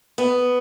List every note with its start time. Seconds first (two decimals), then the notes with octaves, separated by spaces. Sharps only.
0.18 B3